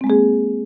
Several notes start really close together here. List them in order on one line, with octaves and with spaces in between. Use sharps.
C4 G#3 A#3 G#4